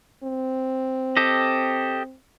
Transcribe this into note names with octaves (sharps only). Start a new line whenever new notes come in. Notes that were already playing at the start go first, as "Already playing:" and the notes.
C4
G4 A4 D#5